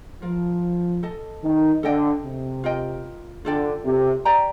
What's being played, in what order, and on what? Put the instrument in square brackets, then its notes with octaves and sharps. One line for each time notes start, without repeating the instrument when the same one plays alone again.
[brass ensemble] F3 [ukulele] F4 A#4 F5
[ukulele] A4 D#5 A5
[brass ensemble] D#3
[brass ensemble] D3 [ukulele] A4 D#5 G5
[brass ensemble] C3
[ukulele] F4 A#4 D#5 G5
[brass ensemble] D3 [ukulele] F4 A4 D5 G5
[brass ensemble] C3
[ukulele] G4 D5 G5 A#5